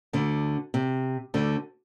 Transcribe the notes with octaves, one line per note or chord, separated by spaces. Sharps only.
D2 D3
C3
D2 D3